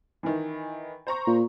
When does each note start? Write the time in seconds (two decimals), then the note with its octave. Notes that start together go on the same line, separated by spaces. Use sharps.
0.23 D#3 E3
1.07 C5 A#5 C#6
1.27 A#2